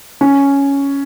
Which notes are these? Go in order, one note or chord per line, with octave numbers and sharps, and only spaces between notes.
C#4